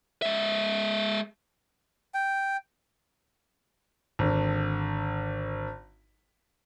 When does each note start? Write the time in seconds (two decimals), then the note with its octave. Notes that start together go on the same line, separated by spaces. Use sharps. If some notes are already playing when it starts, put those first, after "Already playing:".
0.22 G#3 E5
2.14 G5
4.19 G#1 D3